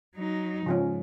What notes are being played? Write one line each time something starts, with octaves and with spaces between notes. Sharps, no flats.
F#3 D#4
G#2 C#3 F3 C#4